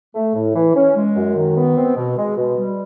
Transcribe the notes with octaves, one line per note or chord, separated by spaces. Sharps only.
A3
A2
E3
C#4
G#3
F#2
D#3
B3
C4
B2
G#3
B2
G3